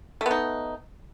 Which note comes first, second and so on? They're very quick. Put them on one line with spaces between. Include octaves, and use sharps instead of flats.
A3 B3 D#4